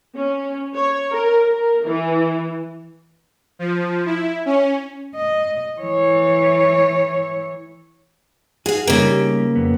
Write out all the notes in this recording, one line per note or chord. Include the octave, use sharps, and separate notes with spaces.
C#4
C#5
A#4
A#4
E3
F3
E4
C#4
D#5
E3 C#5
F#4 G#4 F5
C#3 G3 A#3 D#4 G4
F2 B3